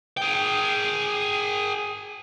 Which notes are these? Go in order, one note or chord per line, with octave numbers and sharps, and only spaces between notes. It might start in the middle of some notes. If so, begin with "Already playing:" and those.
G#4 G5